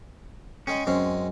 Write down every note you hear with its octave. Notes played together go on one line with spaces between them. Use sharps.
G#3 C#4 G#4 G5
F#2 G#3 C4 C#4